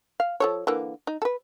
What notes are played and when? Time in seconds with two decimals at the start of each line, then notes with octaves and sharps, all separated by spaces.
0.20 F5
0.40 F3 A4 C#5
0.67 D3 E3 A#3
1.07 D#4
1.22 A4 B4